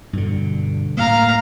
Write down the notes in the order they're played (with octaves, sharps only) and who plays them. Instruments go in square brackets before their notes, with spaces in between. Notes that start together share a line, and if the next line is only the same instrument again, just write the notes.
[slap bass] G2 B2 D3
[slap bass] A2 A#3 [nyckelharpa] F5 A#5